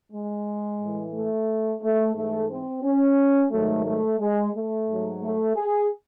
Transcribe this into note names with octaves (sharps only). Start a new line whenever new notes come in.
G#3
A2 E3
A3
A3
G#2 E3 A3
C4
C#4
G#2 D#3 F#3 A3
A3
G#3
A3
G#2 F#3
A3
G#4